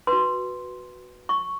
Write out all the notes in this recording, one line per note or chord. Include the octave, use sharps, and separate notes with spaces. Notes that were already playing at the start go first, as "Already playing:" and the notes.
B4 C6
F#4
C#6